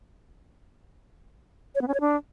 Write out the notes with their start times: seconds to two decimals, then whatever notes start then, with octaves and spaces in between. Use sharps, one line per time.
1.75 C#5
1.81 B3
1.88 C#4
1.94 C#5
2.01 D4